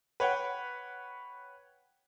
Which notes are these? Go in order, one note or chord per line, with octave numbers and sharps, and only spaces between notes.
B4 C#5 F#5 G5